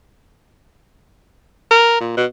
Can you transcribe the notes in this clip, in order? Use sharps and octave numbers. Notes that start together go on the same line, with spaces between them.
A#4
A#2
B2